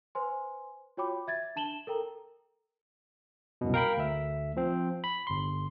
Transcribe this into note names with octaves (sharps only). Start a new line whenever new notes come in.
B4 C5 G#5 C6
F4 F#4 C#5 G5 B5 D6
E5 G#6 A6
D4 A5 E7 F#7 G7
A4 A#4 G5 A#5
C2 F#2 B2
A#4 F5 G5 A#5 B5
D2 E5
F3 C4
B5
G1 C6